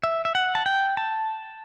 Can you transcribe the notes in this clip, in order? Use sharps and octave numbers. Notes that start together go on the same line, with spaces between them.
E5
E5
F#5
A5
G5
A5